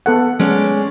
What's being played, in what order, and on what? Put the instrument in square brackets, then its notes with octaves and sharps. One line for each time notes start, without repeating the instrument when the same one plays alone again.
[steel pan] B3 A4 F#5
[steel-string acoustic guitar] G#3 C#4 D5